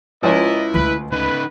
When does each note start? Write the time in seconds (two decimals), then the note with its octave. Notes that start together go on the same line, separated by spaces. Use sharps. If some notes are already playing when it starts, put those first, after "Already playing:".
0.23 C#2 F3 C#4 E4 A#4 D5 D#5
0.74 D2 G#3 B4
1.12 C#3 D#4 B4